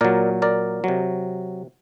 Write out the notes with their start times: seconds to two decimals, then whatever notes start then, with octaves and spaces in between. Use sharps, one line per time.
0.01 A#2 F#3 A#4 D5
0.42 A#4 D5
0.84 C3 F#3